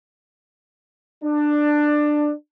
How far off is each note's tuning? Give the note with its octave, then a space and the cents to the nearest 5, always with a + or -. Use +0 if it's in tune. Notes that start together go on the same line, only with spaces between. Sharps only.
D4 +15